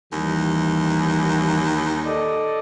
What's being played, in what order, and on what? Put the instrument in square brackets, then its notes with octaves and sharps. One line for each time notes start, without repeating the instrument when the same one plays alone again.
[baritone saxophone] D#2 [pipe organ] E3 G3
[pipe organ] A4 D5 D#5